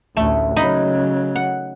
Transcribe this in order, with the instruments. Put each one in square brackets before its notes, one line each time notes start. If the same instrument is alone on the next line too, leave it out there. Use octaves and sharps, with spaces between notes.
[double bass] A1 D2 [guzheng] A3
[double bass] C#3 F#3 [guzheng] D#4 D#5 B5
[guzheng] F#5